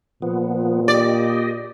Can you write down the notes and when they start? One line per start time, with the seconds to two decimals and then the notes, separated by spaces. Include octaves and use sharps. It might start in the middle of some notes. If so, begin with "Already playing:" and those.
0.22 A#2 F3 B3
0.88 G4 D5 D#5